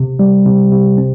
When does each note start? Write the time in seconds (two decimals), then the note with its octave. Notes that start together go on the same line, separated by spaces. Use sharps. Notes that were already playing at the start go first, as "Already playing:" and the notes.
Already playing: C3
0.19 G3
0.46 C3
0.71 C3
0.98 C4